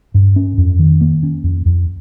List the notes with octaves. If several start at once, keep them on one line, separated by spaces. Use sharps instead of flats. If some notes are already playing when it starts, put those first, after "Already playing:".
G2
C#4
F2
D#3
A#3
C#4
F2
F2